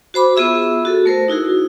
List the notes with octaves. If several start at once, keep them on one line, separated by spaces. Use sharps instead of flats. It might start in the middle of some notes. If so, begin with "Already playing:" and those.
F#4 C5 B5 D6
B3 F4 G#4 E5 E6
F#4 A4
A3 A#4 C5
D#4 E4 F#4 G#4